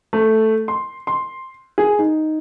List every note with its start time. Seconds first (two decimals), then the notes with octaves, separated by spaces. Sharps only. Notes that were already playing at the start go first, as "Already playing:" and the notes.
0.13 A3
0.68 C6
1.07 C6
1.78 G#4
1.99 D#4